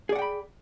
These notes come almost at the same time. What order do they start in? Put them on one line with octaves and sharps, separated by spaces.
G#4 D5 F#5 G5 B5